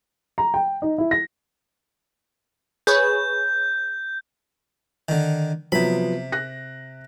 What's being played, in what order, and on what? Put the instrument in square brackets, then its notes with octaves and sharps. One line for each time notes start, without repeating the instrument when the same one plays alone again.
[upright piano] A#5
G5
D#4
E4
A#6
[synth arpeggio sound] G#4 B4 C#5 [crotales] G6
[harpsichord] D3 D#3
[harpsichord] C3 B5 [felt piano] F3 F#3 B3
[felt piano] F#6 A#6